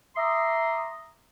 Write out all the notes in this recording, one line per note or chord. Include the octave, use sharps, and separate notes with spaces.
E5 A#5 C6 D6 D#6